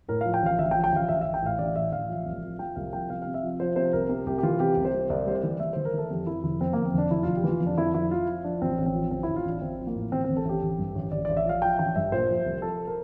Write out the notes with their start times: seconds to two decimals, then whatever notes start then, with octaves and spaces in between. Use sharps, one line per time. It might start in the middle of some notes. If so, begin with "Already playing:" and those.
0.09 A2 A#4
0.21 F3 F5
0.34 G5
0.42 A1 F5
0.58 A1 E5
0.71 G5
0.75 F3
0.84 G5
0.92 A1 F5
1.09 A1 E5
1.21 A1 E5
1.34 G5
1.42 A2 F5
1.59 A1 D5
1.76 A2 E5
1.92 A1 F5
2.09 F3
2.26 C2
2.42 F3
2.59 F3 G5
2.76 C2 F5
2.93 F3 G5
3.10 C3 F5
3.22 C3 F5
3.34 E5
3.43 F3
3.60 F3 C5
3.76 C3 C5
3.93 C2 A#4
4.09 C3
4.26 C2 G4
4.38 G4
4.43 E3 F4
4.60 C3 G4
4.76 C2
4.85 C5
4.93 G3
5.10 C2 D5
5.26 G3 C5
5.35 D5
5.43 E3
5.60 E3 E5
5.73 E3 C5
5.85 A#4
5.94 E3 A4
6.10 F2 G4
6.27 F2 E4
6.44 F1 E4
6.61 F2 C4
6.73 F2 A#3
6.85 C4
6.94 F1 D4
7.11 F1 E4
7.23 F1 F4
7.36 G4
7.44 E3 F4
7.60 F2
7.67 D4
7.77 F2 E4
7.94 F2 E4
8.11 F3 F4
8.28 F3
8.44 F3 D4
8.62 A1 C4
8.78 A1
8.86 C4
8.95 F3
9.11 A1 C4
9.23 A1 E4
9.36 F4
9.45 A1 D4
9.61 A1 C4
9.78 F3
9.87 A#3
9.95 A2
10.11 A1 C4
10.24 A1 C4
10.37 A4
10.45 A1 G4
10.62 A1
10.78 G2
10.95 A1
11.12 A1 D5
11.25 A1 D5
11.37 E5
11.46 F3 F5
11.62 F3 G5
11.79 A1 G5
11.96 G2 E5
12.12 A#2 C5
12.29 F3
12.46 C2
12.62 F3 A4
12.87 A#4